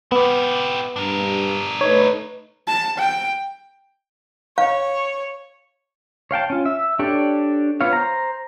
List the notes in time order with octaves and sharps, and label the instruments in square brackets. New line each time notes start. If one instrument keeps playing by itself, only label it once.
[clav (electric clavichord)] B3 [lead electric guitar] E4 G4
[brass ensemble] G2 [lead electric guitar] D4 A#4
[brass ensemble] A3 D#4 B4 [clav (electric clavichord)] C#5
[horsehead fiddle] A5
G5
[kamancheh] C#5 [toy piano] F5
[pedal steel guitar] C#5 F5 G5 A5
C#4 F4
E5
D4 G4 A4 C#5 D5
B3 F4 C#5 F5
C5 A#5